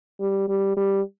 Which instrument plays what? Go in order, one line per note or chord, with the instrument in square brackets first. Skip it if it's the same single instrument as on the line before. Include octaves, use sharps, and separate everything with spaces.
[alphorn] G3
G3
G3